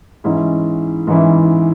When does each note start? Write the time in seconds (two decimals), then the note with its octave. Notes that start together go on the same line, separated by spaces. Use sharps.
0.24 G#2 E3 C#4 E4
1.07 G#2 E3 C#4 E4